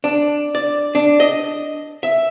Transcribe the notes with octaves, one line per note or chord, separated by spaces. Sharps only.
D4
D5
D4
D#5
E5